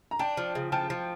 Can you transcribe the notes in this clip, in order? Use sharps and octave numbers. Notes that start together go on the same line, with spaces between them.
A#5
D4 G5 A5
F3
C#3
F3 G5 A5
F3